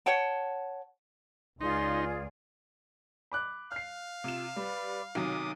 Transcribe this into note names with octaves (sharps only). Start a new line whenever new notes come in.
C#5 F#5 G5 A5
C#2 D#4 F4 G#4 D5 C6
B5 D6 F#6
F5 F6 C7
C3 F4 E7
G3 B4 D5
B1 C3 D#3 F#3 D6 D#6